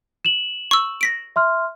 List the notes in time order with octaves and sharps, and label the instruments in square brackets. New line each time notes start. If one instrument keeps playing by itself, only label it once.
[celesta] E7 F#7
[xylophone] C#6 E6
A#6 B6 D7
[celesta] E5 C6 F6